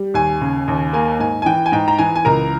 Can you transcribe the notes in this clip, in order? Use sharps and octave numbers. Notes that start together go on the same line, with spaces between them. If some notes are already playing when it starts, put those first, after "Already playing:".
Already playing: G3
D#2 G#5
C#3
D#2
A#3 G#5
G#2 G#5
G#5
E3 G5
G#5
G#2 G5
A#5
E3 G#5
G#5
C#2 A#4 A#5